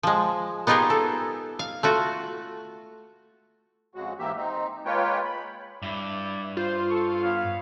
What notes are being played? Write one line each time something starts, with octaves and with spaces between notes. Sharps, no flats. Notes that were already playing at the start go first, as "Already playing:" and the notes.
F3 G#3
B3 D#4 F4 G4 G#4 A#4
A4
F5
A3 F4 F#4
F2 C#3 G#3 F#4
G#2 E3 A#3 G4 E5
C4 D#4
G#3 A#3 F4 B4 C#5 G5
B5
G2 E4 D5
F4 C5
A4 C#6
B3 C#5 F5